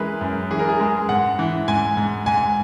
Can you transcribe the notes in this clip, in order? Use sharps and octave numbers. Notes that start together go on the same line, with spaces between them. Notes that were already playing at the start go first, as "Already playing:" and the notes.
Already playing: E3 G#3 G#4 A#4 B4
F#2
E3 G#4
A#4
G#4
G#3
G#2 F#5
E3
G#2 G#5
G#2
G#2 G#5